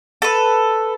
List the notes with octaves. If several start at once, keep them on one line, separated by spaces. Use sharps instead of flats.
A4 B4